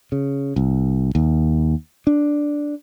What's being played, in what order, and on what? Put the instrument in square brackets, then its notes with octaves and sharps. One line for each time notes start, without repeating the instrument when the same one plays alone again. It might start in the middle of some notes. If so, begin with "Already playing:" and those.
[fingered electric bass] C#3
C2
D#2
D4